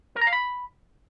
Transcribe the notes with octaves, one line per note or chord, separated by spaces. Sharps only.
A#4
A#5
F5
B5